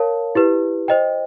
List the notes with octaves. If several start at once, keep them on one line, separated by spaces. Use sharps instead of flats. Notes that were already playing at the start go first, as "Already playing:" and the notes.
Already playing: A#4 C#5 F5 A5
E4 G4 B4
C5 D#5 G5